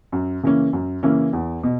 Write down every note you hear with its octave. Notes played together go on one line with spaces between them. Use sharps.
F#2
C#3 E3 A#3 C#4
F#2
C#3 E3 A#3 C#4
E2
B2